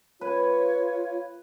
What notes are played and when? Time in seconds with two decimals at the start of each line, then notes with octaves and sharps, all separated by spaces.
0.21 F4 B4 C#5